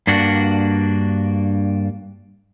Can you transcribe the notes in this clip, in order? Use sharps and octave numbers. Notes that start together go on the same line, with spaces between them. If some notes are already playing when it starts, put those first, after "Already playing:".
G2 A#3 D4 F#4